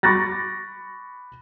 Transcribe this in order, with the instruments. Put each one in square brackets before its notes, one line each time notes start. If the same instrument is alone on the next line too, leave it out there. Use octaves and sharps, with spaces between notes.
[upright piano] B5 C#6 D6 F#6 A6 A#6